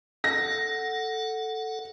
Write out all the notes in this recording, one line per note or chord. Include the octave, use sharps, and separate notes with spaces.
A4 F#5 A#6